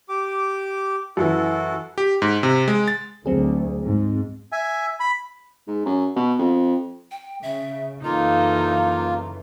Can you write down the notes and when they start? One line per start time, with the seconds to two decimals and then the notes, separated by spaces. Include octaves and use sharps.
0.09 G4 D6
1.17 F#2 E3 E4 F#4 A4
1.98 G4
2.22 G#2
2.43 C3
2.68 G#3
2.88 A6
3.26 D2 F#3 C4 G#4
3.84 G#2
4.52 E5 G#5
5.00 B5
5.67 G#2
5.86 F#2
6.16 B2
6.39 F2
7.11 G5
7.43 C#3 E5
8.04 F#2 C#3 E3 A#3 D#4 F4 A4 A#5